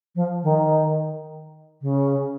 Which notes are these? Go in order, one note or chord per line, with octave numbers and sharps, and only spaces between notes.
F3
D#3
C#3